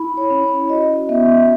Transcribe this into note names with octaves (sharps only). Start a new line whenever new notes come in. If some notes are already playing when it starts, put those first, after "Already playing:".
Already playing: E4 B5
C#5
C#4
C#5
F#4 D#5
B3 E5